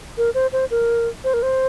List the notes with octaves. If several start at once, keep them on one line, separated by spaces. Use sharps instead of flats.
A#4
C5
C5
A#4
C5
A#4
C5